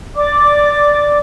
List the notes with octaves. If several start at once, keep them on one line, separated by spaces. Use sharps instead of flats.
D5 D6